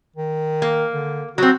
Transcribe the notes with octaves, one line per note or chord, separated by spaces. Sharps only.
D#3
A#3
D3
F#3 C4 F#4